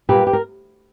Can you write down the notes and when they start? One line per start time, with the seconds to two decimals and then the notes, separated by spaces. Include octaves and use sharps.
0.09 A#2 G3 A#3 G4 B4
0.27 G4
0.33 A#4